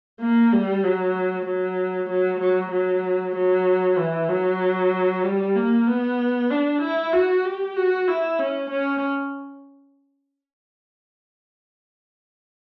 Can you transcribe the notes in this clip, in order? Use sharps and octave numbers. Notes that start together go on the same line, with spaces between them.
A#3
G3
F#3
F#3
F#3
F#3
F#3
F#3
E3
F#3
G3
A#3
B3
D4
E4
F#4
G4
F#4
E4
C#4
C#4